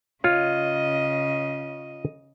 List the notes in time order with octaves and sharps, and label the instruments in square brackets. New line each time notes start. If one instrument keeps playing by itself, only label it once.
[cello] C#3 D#5 [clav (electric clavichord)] F4 C#5